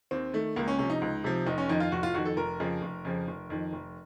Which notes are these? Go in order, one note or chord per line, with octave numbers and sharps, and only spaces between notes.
D#2 C4
D#3 A3
C#2 A#3
C#4
C3 F3 C#4
D#4
C#2
C3 F3
F1 D#4
C#4
F2 D#3 D#4
F4
F1 F#4
F4
F2 D#3 F#4
A4
F1 A#4
F2 C#3 F3
F1
F2 C#3 F3
F1
F2 D#3
F1